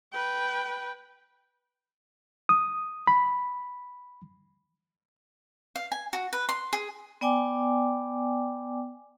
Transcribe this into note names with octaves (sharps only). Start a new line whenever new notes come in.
B4 G5
D#6
B5
F5
G#5
F#4
B4
C6
G#4
B3 D5 G5 G#5 D6